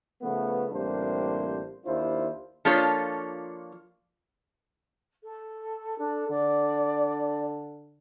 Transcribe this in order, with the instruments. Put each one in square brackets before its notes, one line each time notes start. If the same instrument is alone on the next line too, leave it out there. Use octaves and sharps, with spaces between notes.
[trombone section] C#3 F3 A3 B3
A1 C3 G3 A#3 D4 C5
D#2 D4 E4 F4 C5
[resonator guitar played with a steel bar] F3 A#3 D4 F4 A4 C#5
[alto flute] A4
[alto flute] D4 [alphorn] A4
[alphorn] D3 [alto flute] D5